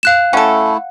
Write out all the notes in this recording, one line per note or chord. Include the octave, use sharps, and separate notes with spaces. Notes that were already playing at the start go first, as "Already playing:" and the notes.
F5 F#6 E7
A3 C#4 E4 A4 F#5